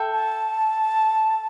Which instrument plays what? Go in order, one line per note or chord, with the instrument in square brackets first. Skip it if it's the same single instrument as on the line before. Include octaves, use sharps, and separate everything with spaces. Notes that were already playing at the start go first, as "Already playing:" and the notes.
Already playing: [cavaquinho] A4 E5 G5
[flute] A5